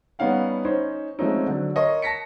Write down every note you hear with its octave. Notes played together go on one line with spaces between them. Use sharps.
G3 B3 C#4 D#4 F5 F#5
C#4 D#4 C5
F3 G#3 A3 C4 C#4 D#4
D3 F#3 D4
A#4 C#5 D#5 A5 C6 C#6
A5 A#6 B6 C#7